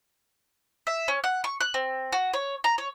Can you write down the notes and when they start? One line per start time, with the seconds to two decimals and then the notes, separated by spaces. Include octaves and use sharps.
0.87 E5
1.08 C#4
1.24 F#5
1.44 C#6
1.61 F#6
1.74 C4
2.12 F#4
2.34 C#5
2.64 A#5
2.78 C#5